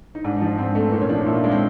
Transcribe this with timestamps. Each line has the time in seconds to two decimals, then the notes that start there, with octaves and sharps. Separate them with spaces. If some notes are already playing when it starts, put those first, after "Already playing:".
0.15 D#4
0.24 G#2 D4
0.36 D#4
0.41 F3 D4
0.58 G#2 C4
0.75 A3 C4
0.88 B3
0.92 A#2 C4
1.01 C#4
1.09 F3 D4
1.19 D#4
1.26 A#2 E4
1.35 F4
1.44 G#3 D4
1.51 C4